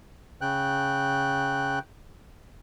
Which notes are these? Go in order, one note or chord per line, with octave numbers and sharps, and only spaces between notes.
C#3 G5 F#6